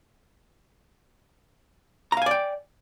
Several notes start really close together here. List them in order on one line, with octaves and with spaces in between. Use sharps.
A#5 F5 G#5 D5 G5